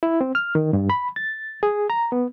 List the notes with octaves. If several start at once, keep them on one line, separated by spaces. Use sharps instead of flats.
E4
C4
F6
D#3
G2
B5
A6
G#4
A#5
B3